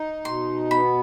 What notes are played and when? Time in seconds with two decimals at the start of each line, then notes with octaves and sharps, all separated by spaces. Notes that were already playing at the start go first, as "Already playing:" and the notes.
Already playing: D#4
0.25 B2 C6
0.71 B3 B5